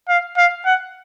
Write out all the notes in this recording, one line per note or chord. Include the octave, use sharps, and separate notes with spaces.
F5
F5
F#5